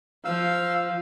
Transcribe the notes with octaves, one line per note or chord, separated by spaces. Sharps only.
F3 F5 E6